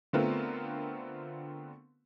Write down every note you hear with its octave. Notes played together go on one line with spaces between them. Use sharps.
D3 A3 B3 C4 F4 A#4